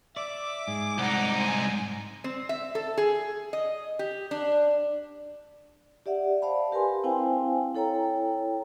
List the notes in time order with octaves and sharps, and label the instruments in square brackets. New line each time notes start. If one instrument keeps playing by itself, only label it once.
[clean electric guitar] D5 [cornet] E5 [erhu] D6
[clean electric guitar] G#2 [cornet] G#4
[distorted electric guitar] C2 D#4 [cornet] F#5
[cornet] C5 [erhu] G#5
[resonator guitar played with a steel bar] C4
E5
A4
G#4
D#5
G4
D4
[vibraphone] G4 D5 E5 F#5
C5 D5 F5 A5 B5
G4 A#4 B4 G#5 C6
C4 E4 C5 F5 G5 G#5
E4 A4 C#5 G5 A#5